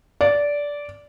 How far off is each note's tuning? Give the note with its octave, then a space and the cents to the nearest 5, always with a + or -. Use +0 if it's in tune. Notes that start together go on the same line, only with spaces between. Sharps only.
D5 -15